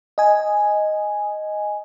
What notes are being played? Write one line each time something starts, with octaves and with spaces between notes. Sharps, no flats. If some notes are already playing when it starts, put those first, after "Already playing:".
D#5 G#5